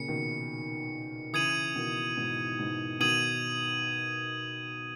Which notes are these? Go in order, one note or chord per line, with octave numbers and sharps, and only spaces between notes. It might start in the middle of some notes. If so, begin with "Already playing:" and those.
Already playing: A#2 C#3 C#7
B2 D#3
C#3 E3 D#6 G#6 D#7 F#7
B2 D#3
G#2 B2
G#2 B2
B2 D#3 D#6 G#6 D#7 F#7